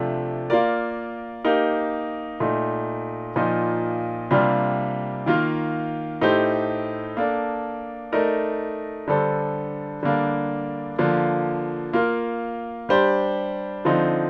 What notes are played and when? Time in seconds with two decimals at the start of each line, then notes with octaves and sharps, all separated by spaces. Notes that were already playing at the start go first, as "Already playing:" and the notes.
Already playing: C3 F3 A3 D4
0.50 A#3 F4 A#4 D5
1.45 A#3 D#4 G4 A#4
2.40 A#2 A3 D#4
3.36 A#2 F3 A#3 D#4
4.31 C3 G3 A#3 D4 F4
5.26 D#3 A#3 F4
6.21 A2 A3 D#4 G4 C5
7.17 A#3 D4 A4
8.12 A3 D#4 A#4 D5
9.07 D3 G3 D4 A4 C5
10.03 D3 G3 A#3 D4
10.98 D3 F3 A#3
11.93 A#3 F4 A#4
12.89 G3 D4 G4 C5
13.85 D3 F3 C4 D#4